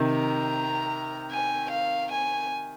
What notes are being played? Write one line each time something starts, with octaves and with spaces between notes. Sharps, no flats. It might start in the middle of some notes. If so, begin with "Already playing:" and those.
Already playing: C3 D#3
A#5
G#5
F5
G#5